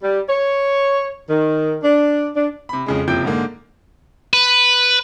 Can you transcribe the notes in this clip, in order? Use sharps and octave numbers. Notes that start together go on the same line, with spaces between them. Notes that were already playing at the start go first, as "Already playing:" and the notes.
G3
C#5
D#3
D4
D4
C3 B5
F2 C#3 G#3
F#1 C3 F3 G5 G6 D7
G#2 D3 A#3
B4